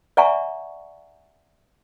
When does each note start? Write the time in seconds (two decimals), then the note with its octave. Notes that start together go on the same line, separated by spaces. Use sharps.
0.17 D5 E5 F#5 G#5 A#5 C#6